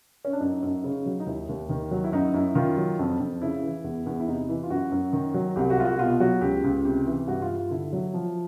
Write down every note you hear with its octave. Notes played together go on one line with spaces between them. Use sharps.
C#4
D4
F#2 D#4
F#2
C#3
F#3
D#4
D#2 E4
D#2
D#3
F#3
E4
F#2 D#4
F#2 E4
D#3 F4
F#3
F2
F2
C#3 E4
E3
E2
E2
E4
C3 D#4
E3 E4
F4
F#2 F#4
F#2
D#3
F#3
C2 G4
F#4
C2 F4
F#4
B2 F4
F#3 F#4
C#2 G4
C#2
C3 G4
E3
G2 F#4
F4
G2
F4
D3 E4
F#3
F3